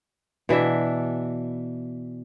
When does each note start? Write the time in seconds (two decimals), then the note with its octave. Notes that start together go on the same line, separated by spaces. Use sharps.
0.49 B2 E3 D4 E5